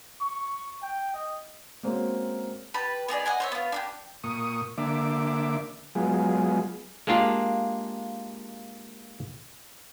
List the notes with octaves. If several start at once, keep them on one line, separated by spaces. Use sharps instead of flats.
C#6
G5
D#5
G#3 A#3 C4 C#4 F#4
G4 B4 A5
B3 D#4 G#4 D5
D#5 F#5 G#5
C5 C#5 E5
B3 F4
D4 F#4 G4
A#2 C#6 D#6
D3 A#3 E5 D6
F#3 G#3 B3 F4 G#4
G#3 A#3 D4 F4 G4